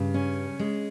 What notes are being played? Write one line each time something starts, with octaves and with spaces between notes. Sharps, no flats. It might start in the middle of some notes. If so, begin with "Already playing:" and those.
Already playing: G2 C#3
C#4
G#3